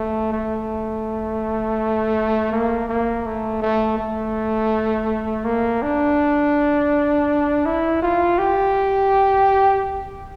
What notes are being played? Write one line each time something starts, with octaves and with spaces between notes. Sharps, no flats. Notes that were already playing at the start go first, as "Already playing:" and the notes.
Already playing: A3
A3
A#3
A#3
A3
A3
A3
A#3
D4
E4
F4
G4